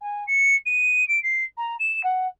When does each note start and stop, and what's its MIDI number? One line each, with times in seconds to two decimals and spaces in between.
0.01 0.24 80
0.27 0.55 97
0.66 1.06 99
1.08 1.21 98
1.23 1.44 96
1.57 1.74 82
1.79 2.03 100
2.03 2.27 78